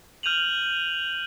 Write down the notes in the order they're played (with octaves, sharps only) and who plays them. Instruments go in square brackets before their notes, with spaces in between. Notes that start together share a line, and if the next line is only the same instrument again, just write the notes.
[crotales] F6 G6 D#7 F7 F#7